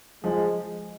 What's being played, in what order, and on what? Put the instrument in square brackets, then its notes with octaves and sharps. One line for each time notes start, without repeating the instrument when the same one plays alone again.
[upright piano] F3 [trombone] G#3